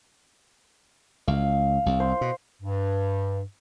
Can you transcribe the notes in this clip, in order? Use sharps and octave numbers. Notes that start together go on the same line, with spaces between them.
C#2 F5
C2
C5
B2
G2